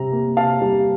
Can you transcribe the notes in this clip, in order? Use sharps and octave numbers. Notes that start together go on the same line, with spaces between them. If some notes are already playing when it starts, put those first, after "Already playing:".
Already playing: C3 G3 A#5
A#3
C3 F5 A5
G3